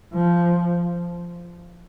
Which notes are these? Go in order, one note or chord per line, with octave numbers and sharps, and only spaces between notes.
F3